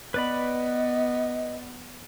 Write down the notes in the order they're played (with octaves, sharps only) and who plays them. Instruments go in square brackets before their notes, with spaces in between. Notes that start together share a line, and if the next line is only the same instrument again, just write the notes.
[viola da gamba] B3 [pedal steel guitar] B4 D5 B5 [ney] D#5